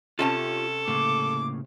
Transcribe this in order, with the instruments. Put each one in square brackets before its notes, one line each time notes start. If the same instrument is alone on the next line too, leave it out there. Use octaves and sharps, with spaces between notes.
[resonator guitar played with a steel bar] C3 C#4 A5 [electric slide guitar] F4 G4 [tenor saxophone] A4
[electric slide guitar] A2 C#3 A#3 [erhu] D6